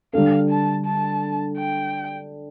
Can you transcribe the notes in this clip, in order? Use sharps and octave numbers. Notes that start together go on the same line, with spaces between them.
D3 G3 D4 A4 F5
A5
A5
G5